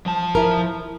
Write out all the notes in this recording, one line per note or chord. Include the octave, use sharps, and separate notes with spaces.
F3 A5
E4 A#4